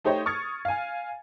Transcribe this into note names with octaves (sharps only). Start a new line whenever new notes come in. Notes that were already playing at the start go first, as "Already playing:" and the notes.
A3 D#4 G4 C5 C#5 D#5
C#6 D#6 F6 G#6 A6 C#7
F5 G#5